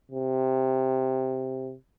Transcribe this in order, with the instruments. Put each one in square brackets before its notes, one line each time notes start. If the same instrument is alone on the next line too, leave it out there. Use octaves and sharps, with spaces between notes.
[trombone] C3